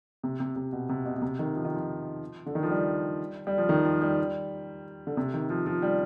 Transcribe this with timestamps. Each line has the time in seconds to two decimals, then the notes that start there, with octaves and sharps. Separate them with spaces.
0.23 C3
0.40 C3
0.56 C3
0.72 B2
0.89 C3
1.05 B2
1.15 B2
1.22 C3
1.39 D#3
1.55 F3
1.65 D#3
1.74 F3
2.46 D3
2.55 D#3
2.63 F3
2.70 G3
3.47 G3
3.58 F3
3.69 D#3
3.85 F3
4.02 G3
5.07 D3
5.17 C3
5.34 D#3
5.50 F3
5.66 F3
5.82 G3